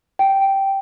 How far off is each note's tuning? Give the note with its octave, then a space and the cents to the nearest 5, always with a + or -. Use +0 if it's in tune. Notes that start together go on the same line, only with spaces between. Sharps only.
G5 -5